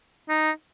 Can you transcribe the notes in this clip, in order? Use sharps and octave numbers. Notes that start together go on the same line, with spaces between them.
D#4